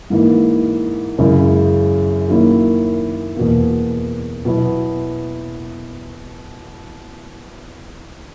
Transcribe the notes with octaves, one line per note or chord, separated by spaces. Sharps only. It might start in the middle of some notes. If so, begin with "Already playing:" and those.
G#2 E3 A#3 E4
F#2 C#3 G#3 C#4 E4
D#3 F#3 A#3 C#4 E4
E2 B2 A#3
B2 F#3 B3 E4